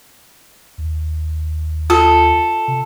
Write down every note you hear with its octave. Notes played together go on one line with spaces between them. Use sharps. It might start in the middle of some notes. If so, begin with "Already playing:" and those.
D#2
F4 A4
C3